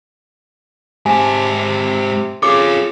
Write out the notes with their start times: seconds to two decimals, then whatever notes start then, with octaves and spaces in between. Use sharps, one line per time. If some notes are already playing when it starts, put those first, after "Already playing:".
1.06 G#2 C3 G#5 A5
1.59 C3
2.43 C#3 F4 A4 D6